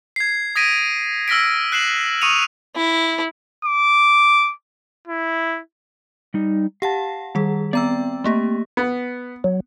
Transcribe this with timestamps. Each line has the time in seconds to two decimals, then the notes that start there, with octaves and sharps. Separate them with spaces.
0.16 G#6 C7
0.55 D#6 G#6 A#6 B6 D7 D#7
1.28 E6 F6 A#6 B6 D7
1.72 F#6 C7 E7 F#7
2.21 C#6 D#6 C#7 D#7 F7
2.76 E4
3.65 D6
5.08 E4
6.34 G3 D#4
6.82 G4 F5 F#5 A5
7.35 D#3 G3 G#4
7.73 B3 C4 D5 A#5 E6
8.24 A3 A#3 G4
8.77 B3
9.44 F#3